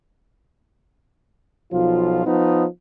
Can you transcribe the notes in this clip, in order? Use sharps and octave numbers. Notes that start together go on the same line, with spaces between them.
B1 F3 F4
F3 B3 D#4